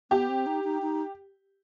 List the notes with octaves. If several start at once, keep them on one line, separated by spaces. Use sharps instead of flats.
B3 G4
C4
D#4
D#4
D#4